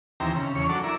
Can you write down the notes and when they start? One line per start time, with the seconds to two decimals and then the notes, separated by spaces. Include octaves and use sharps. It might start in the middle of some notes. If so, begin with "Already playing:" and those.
0.20 D#2 E3 C4 G4 A#5
0.35 C#3
0.55 E2 C#4 C#5 C#6
0.69 F#3 D4 A4
0.83 E4 A#4 D5